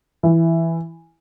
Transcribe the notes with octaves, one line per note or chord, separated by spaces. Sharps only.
E3